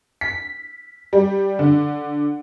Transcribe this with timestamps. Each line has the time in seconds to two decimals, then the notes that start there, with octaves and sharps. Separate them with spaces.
0.21 B6
1.13 G3
1.59 D3